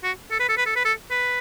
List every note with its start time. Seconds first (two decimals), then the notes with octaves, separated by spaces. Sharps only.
0.03 F#4
0.31 A4
0.40 B4
0.49 A4
0.57 B4
0.66 A4
0.76 B4
0.85 A4
1.10 B4